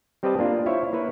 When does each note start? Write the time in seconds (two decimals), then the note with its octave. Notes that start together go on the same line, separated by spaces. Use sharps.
0.23 G3 C4 G4 B4 D#5 A5
0.39 A#3 D4 F4
0.66 E4 C5 C#5 E5 F5
0.93 A#3 E4 B4 C#5